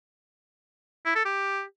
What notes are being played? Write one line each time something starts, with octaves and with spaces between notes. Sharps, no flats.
E4
A4
G4